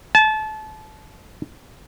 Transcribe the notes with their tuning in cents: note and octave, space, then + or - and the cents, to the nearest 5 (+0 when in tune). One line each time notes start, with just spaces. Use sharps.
A5 -30